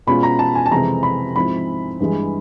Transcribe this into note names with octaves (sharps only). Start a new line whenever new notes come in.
B2 G#3 C#4 F4 B5
A#5
A5
G#5
A5
F2 C3 E3 G#3 C4 A#5
B5
G#2 F3 G#3 C4 E4 B5
G2 E3 G#3